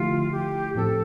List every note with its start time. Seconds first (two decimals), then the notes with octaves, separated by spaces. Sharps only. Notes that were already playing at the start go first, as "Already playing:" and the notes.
Already playing: D3 F3 A3 E4 F4 G4
0.32 G4
0.75 A2 F3 C4 G4 A4